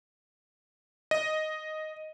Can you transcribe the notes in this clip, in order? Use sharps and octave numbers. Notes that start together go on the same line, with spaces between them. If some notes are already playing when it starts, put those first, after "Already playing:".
D#5